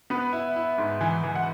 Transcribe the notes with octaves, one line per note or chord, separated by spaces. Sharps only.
B3 B4
E4
E4
G#2
E3
E3
F#5